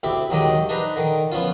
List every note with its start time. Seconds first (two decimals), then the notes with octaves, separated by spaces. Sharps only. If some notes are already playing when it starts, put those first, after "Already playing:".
0.03 D2 C4 E4 G4 D6
0.30 D#2 D#3 F#3 G#3 G4 D#5
0.69 D4 D#4 B4 C5 A#5
0.96 D3 D#3
1.32 F3 B3 C#4 F4